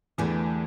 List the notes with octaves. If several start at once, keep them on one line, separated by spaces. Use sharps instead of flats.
E2 D3 E3 A3 D4 G4